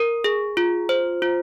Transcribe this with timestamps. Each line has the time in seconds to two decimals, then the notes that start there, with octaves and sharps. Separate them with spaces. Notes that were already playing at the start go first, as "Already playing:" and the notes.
Already playing: A#4
0.24 G#4
0.57 F4
0.89 C5
1.22 F4